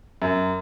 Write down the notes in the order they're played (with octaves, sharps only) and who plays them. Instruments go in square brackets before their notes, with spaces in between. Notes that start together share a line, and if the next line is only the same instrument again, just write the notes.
[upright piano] F#2